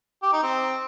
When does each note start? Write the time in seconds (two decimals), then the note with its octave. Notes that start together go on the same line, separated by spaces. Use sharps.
0.22 G4
0.33 D#4
0.43 C4